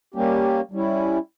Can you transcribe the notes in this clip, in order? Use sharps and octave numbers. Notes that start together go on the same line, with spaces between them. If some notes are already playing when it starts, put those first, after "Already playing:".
G3 A#3 C#4 G4
G3 C#4 E4